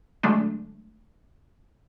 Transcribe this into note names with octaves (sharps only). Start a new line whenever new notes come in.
D3 F#3 G#3 A3 D4